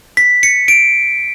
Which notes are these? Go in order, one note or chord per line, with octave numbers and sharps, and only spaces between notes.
B6
C#7
D7